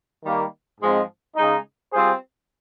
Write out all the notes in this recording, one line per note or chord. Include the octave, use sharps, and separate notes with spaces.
D#3 G3 A#3
G#2 F3 G#3 C4
C#3 G#3 D#4
G3 C4 F4 G#4 C5